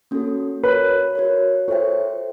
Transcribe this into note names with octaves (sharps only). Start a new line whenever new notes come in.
A#3 C#4 F#4 A4
F#4 A#4 B4 C#5
F#4 A#4 C#5
F4 A4 C5 C#5 E5 G5